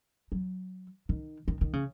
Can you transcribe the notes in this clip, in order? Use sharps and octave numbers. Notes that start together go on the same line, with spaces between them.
F#3
D#3
D#3
D#3
C#3